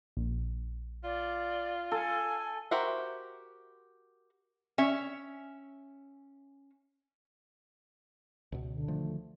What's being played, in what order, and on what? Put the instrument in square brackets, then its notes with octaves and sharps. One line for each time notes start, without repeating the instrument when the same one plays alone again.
[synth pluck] A#1
[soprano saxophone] F4 [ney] D5
[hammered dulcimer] A4 [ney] G#5
[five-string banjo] F#4 G4 A#4 C5 E5
[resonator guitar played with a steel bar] C#4 E5
[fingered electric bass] C#2 B2
[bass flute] D3
[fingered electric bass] D#3 F3 A3